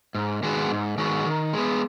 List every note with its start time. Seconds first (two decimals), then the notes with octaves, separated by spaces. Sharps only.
0.15 G#2
0.43 D#3 G#3 B3 F#4
0.71 G#2
0.98 D#3 G#3 B3 F#4
1.26 D#3
1.53 G#3 B3